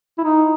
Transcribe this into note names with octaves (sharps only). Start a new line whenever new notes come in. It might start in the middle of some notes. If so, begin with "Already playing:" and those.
E4
D#4